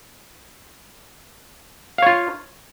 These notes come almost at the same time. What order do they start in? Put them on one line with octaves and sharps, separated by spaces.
F5 C#5 F4